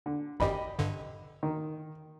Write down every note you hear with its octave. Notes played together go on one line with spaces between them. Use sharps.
D3
G#1 F#2 G4 D#5 B5
G2 D3
D#3